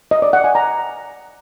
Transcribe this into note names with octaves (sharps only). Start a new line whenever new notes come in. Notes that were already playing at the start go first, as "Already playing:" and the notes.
D#5
D5
F#5
G#5
A#5